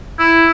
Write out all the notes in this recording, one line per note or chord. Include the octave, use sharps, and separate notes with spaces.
E4